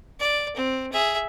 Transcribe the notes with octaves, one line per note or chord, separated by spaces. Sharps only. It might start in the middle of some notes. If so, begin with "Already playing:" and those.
D5
C4
G#4 E5